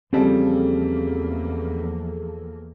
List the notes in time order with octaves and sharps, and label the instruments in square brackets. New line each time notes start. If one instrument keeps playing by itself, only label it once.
[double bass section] E2 A#3 [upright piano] C#3 G3 [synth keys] F3 G#4 A4 [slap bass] C4